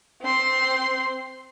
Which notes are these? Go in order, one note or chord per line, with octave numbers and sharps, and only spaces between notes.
C4 C6